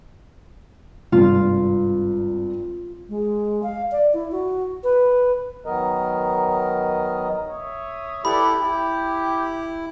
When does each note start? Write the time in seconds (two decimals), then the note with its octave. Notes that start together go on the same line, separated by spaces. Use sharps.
1.12 G#1 G2 C3 F4
3.09 G#3
3.63 F5
3.92 D5
4.14 E4
4.32 F#4
4.84 B4
5.66 D#3 F#3 B3 A#4 D#5
7.50 C#5 E5 D#6
8.25 E4 G4 A4 B4 D5 B5
8.62 E4 G4